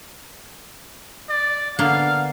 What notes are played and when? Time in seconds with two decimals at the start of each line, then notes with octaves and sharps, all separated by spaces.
1.29 D5
1.79 D3 A#3 B3 F5